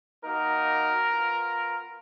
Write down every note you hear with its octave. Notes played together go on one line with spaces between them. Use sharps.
A#3 D#4 F#4 A#4
B3 F4